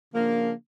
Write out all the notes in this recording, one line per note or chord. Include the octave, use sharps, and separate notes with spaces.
C#3 F3 A#3 D4